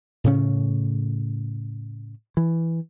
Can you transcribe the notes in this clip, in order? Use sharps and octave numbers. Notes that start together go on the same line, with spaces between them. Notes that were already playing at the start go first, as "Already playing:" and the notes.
A2 C#3 C#4
E3